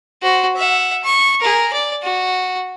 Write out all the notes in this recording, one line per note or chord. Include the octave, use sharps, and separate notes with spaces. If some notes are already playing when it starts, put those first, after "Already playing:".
F#4 C5
E5 F#5
C#6
G#4 A#4
D5
F#4